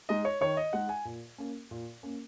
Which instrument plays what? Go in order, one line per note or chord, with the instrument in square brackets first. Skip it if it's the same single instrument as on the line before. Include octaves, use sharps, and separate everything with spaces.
[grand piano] G#3 D#4 D#5
C#5
D#3 C#5
D#5
G#3 D#4 F#5
G#5
A#2
A#3 C#4
A#2
A#3 C#4